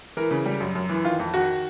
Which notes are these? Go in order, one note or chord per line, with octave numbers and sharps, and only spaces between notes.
E3 A#4
C#3
G3
F#2
F#2
E3
D#3 F4
F2
D#3 F#4